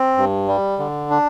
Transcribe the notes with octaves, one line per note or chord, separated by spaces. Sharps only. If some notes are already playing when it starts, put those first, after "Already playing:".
Already playing: C4
G2
G3
D3
D4